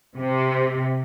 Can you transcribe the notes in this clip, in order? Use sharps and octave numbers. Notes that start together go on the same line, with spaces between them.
C3